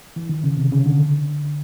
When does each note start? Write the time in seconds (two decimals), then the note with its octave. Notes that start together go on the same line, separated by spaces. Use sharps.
0.16 E3
0.29 D#3
0.44 C#3
0.58 C3
0.72 C#3
0.86 D3